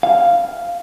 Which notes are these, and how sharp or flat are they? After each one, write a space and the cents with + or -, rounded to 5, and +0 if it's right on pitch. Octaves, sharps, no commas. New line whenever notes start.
F5 -5